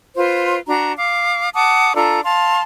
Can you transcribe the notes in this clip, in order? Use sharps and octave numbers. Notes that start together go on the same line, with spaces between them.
F4 B4 C5
D4 F#4 A#5
F5 D6
F#5 A5 D6 D#6
D4 F4 A4 A#5
F5 A5 C6